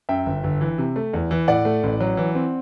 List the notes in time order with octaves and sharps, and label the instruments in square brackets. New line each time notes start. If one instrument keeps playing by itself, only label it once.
[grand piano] F#2 E5 G5
G1
G1
E3
C3
A3
E2
E3
A2 D5 F#5
A3
A1
F#3
E3
C4